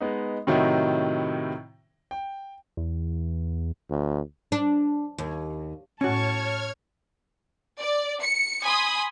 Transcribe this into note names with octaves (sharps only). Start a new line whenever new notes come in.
G#3 B3 D#4
A2 C3 D#3 F#3 D#4 E4
G5
E2
D2
D4
D#2
A2 C#4 F#4 C#5 A5 C#6 F6 G#6
D5
C#7
G#5 B5 C6 D#6